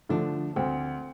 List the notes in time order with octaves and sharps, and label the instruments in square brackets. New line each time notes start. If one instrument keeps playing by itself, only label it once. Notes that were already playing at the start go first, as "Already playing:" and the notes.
[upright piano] D3 F3 A3 [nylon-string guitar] D4
[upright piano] D2 [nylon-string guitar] C4